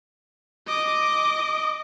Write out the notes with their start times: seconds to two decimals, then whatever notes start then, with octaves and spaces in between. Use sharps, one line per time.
0.67 D#5 D6